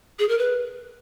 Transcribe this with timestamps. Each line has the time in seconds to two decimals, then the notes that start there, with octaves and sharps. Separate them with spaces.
0.19 G#4
0.29 A#4
0.39 B4